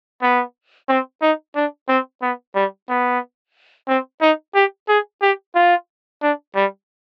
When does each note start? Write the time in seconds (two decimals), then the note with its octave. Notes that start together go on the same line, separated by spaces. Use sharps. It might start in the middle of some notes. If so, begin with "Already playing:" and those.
0.22 B3
0.89 C4
1.22 D#4
1.55 D4
1.89 C4
2.22 B3
2.55 G3
2.89 B3
3.88 C4
4.21 D#4
4.55 G4
4.88 G#4
5.22 G4
5.55 F4
6.22 D4
6.56 G3